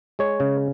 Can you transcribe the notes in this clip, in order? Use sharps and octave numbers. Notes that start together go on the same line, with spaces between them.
G#3 C#5
C#3